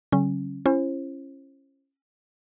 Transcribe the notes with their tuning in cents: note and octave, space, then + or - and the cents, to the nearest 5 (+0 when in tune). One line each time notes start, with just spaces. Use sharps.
D3 -45 F#3 +40 C#4 -20
C#4 -20 E4 +35 C5 +30